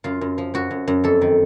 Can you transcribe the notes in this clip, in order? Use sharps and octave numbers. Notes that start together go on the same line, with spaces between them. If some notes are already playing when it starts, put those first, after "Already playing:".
F#2 F4
F#2
F3
F#2 F#4
F#2
F#2
F2 A4
D#3